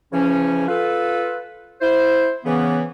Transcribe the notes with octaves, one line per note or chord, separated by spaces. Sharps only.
C#3 E3 F3 C#4
F4 A4 B4
E4 C5
C#3 E3 B3